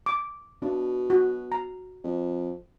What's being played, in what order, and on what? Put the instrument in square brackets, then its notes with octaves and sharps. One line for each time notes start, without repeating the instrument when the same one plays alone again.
[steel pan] D6
[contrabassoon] B2 [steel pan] D4
[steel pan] F#4
A#5
[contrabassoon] F2